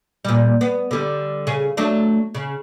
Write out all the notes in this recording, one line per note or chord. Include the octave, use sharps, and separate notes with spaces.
A#2 G3
B3
D3 G3
C#3 G#4
F#3 A3 D4
C#3